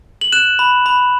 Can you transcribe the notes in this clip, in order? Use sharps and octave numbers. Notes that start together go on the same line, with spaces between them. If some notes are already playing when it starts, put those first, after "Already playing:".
F#7
F#6 E7
B5
B5